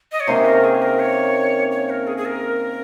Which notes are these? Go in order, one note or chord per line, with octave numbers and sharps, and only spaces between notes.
D#5
C#5
C3 D#3 A#3 C#4 C5
A#4
G#4
C5
A#4
C#5
C#5
A#4
G#4
G#4
A#4